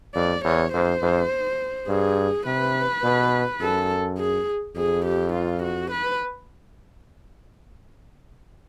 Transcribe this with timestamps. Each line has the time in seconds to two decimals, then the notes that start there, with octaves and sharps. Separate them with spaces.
0.15 F2 D5
0.45 E2 C#5
0.73 F2 C5
1.02 F2
1.88 G2 G#4
2.46 C3 B4
3.04 B2
3.61 F#2 A4
4.18 G#4
4.76 F2 G#4
5.06 G4
5.33 F4
5.63 F#4
5.91 B4